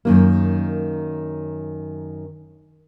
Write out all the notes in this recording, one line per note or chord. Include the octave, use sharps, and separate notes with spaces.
F#2 D#3 A#3